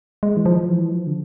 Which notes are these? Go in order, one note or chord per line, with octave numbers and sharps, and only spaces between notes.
G#3
E3
F3
E3
F3
D3